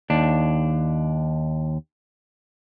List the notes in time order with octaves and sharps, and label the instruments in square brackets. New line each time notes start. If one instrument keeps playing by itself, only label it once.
[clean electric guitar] D#2 D4